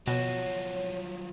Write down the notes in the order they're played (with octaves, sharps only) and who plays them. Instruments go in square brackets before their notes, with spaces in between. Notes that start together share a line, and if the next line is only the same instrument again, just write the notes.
[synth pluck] B2 [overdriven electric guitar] F3 F#3 [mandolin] F#4 [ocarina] C#5